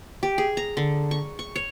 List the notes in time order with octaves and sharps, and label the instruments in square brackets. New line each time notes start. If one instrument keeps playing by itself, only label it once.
[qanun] G4
G#4
A#5
D3
C#6
C#6
C#5